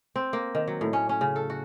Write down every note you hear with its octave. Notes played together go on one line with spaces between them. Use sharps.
C4
A#3
D#3
F#3
A2
C#4
C#4
C#3
A4
F#4